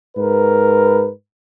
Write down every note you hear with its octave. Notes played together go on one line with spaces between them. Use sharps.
G#2 A#4 B4